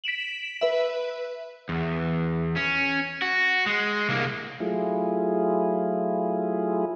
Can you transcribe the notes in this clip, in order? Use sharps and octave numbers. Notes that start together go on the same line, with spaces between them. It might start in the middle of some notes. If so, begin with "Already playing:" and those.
B6 D7 E7 F#7
B4 E5
E2
C#4
F#4
G#3
C2 A#3
F#3 A3 E4 F4 G#4